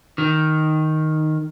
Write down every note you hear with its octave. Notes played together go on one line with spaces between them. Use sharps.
D#3